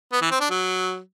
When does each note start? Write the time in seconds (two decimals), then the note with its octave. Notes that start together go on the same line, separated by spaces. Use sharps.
0.12 B3
0.22 E3
0.31 C4
0.40 D4
0.50 F#3